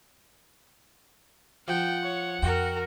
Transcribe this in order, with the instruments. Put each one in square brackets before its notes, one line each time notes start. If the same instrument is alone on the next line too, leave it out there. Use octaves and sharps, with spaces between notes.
[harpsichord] F3 [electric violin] F#5 [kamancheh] G5
[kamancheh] C#5
[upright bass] F2 [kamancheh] F#4 A#4 [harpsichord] G5